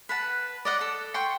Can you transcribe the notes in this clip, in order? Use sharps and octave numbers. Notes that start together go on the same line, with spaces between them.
B4 F#5 A5
D5 D#5 F#5
A4
F#5 G5 C6 C#6